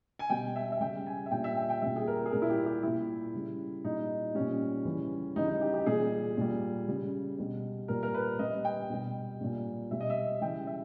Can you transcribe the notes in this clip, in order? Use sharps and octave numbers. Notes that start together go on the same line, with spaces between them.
G#5
B2 G3 G5
E5
E5
C#3 G3 G5
G#5
E5
A#2 G3 G5
E5
G5
G5
A#2 G3 E5
G#4
A#4
G#4
A#2 G3 A#4
E4
G4
G4
A#2 G3 E4
C#3 G3
A#2 G3 D#4
A#2 G3 C#4
C#3 E3 G3
C#3 E3 G3 D#4
D#4
G4
G4
A#2 G3 G#4
A#2 G3
C#3 G3
B2 G3
A#2 G3 A#4
A#4
B4
A#2 G3 D#5
G5
B2 G3
A#2 G3
B2 G3 E5
D#5
E5
C#3 E3 G3 G5
E5